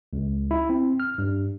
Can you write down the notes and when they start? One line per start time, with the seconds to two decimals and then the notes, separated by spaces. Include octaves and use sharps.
0.13 C#2
0.51 E4
0.69 C4
1.00 F6
1.18 G2